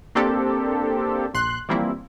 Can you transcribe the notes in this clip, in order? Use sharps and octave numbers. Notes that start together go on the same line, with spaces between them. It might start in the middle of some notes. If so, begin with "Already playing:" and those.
A#3 C4 D4 G4 A4
A#1 C6 F#6
E3 F3 G3 A#3 C4 E4